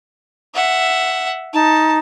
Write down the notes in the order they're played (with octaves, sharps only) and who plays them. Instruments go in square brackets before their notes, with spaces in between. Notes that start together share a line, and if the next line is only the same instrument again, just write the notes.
[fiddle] E5 F#5
[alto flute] D#4 [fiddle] A5